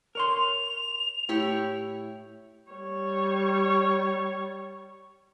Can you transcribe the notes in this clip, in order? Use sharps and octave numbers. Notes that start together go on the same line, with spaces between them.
A#4 C#5 C6 F7
A2 E4 G4 C#5
G3 C#5